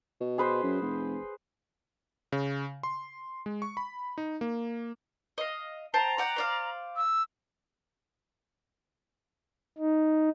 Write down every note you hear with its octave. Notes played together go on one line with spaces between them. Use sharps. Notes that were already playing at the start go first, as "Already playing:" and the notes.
B2
G#4 B4 C5
F#2
F1
C#3
C6
G#3
C#6
B5
D#4
A#3
D#5 F5
C5 G5 A5 A#5
D5 F#5 G5
C5 D5 F5
E6
D#4